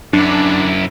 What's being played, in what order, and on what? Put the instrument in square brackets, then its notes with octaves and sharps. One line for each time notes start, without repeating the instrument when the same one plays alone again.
[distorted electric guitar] F#2 E4 [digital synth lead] D4